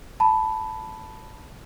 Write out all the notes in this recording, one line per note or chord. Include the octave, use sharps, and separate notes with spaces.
A5 B5